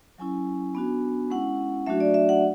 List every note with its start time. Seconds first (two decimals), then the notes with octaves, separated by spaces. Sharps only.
0.18 F#3 C#4 E4 G#5
0.75 B3 D4 F#4
1.30 G#3 C#4 E4 F#5
1.86 F#3 A3 D4 F#4 E5
2.00 D5
2.14 E5
2.29 F#5